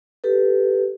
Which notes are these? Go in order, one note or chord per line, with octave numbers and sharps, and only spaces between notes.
G4 A4 B4